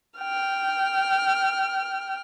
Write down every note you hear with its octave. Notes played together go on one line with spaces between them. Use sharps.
G5 F6